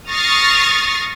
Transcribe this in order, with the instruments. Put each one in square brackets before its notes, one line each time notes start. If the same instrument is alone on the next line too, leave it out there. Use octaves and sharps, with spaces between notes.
[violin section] C#6 D#6 F6 A6 A#6 C7